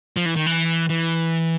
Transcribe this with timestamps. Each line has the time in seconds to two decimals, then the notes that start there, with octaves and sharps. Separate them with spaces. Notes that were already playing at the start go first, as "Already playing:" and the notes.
0.17 F3
0.26 E3
0.36 D#3
0.46 E3
0.89 E3